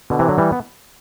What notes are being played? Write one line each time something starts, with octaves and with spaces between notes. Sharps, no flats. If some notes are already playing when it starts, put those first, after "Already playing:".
B2 D3
C3 E3
D3 F#3
E3 G3
B3